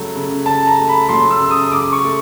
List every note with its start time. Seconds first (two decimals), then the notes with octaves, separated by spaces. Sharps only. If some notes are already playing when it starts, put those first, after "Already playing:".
Already playing: C#3 F#3 A3
0.15 C#3
0.46 C#3 A5
0.67 A#5
0.78 A3
0.89 B5
1.09 F#3 C6
1.30 E6
1.40 C#3
1.50 D#6
1.72 C#3 D6
1.93 C#6
2.03 A3